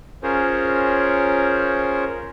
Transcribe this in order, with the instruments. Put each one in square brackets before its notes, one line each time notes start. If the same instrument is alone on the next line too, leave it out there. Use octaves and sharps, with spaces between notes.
[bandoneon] C#4 F4 G#4 A#4 C5 C#5